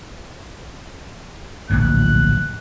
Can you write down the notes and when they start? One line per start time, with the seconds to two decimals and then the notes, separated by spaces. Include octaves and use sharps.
1.70 D1 A#1 F2 F#6